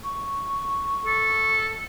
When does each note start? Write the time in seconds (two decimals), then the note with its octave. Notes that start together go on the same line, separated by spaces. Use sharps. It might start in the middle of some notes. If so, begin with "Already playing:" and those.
0.04 C#6
1.06 A4